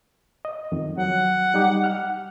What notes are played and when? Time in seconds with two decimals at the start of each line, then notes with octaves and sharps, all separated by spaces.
0.45 D#5
0.72 F2 D#3
0.98 F#3 F#5
1.54 G3 D#4 G4
1.84 F#5 F6